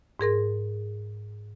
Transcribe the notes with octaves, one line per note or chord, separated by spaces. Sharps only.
G#2 G#4 A#4 C6